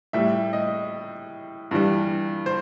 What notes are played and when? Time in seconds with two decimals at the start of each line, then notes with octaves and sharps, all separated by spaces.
0.13 A2 G3 E5
0.53 D#5
1.71 G2 E3 G3
2.46 C5